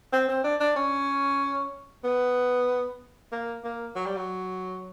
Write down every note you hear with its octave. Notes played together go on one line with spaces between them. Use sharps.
C4
C4
D4
D4
C#4
B3
A#3
A#3
F#3
G3
F#3